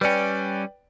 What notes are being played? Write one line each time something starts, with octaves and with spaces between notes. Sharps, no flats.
G3 C#4 B4 D5 G5